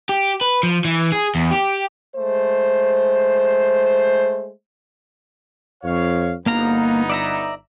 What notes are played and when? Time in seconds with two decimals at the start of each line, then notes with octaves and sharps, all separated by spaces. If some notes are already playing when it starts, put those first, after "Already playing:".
0.09 G4
0.41 B4
0.63 F3
0.85 E3
1.12 G#4
1.35 E2
1.51 G4
2.16 G#3 A3 C5
5.84 F2 C#5 F5
6.46 G1 A#3 B3 D#4 F5 A#5
7.09 D5 E5 A#5